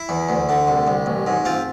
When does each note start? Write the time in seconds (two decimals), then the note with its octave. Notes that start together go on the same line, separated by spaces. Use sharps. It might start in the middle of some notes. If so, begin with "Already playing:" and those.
Already playing: E4
0.09 E2
0.29 D2
0.49 D3
0.67 C2
0.87 C2
1.06 A1
1.27 G#2
1.45 C4 F4